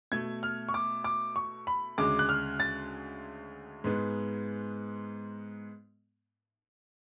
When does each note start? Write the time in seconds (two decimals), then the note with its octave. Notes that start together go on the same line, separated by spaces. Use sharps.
0.12 B2 A3 G#6
0.43 F6
0.69 C#6
0.74 D6
1.04 D6
1.36 C#6
1.67 B5
1.98 D2 C#3 G#3 D6
2.19 F#6
2.29 F6
2.60 A6
3.84 G#2 G#3 B3